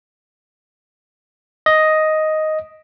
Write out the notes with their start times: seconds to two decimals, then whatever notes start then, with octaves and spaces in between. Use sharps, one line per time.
1.66 D#5